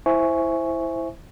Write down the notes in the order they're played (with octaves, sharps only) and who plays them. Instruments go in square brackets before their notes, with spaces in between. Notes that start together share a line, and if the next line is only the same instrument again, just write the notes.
[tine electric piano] E4 C5 E5 G#5 C#6